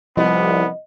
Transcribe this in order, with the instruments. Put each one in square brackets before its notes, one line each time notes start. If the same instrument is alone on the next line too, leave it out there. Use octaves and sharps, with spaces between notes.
[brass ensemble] C2 [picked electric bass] F3 [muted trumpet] B3 [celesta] D#5